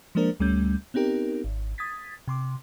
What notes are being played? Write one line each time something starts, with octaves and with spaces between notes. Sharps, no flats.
F3 G#3 A#3 D4 A#4 C5
D2 G3 A3 C#4 G6
B3 C4 D#4 G4 A#4
G#1
D#6 G#6 A6 B6
C3 C6 D6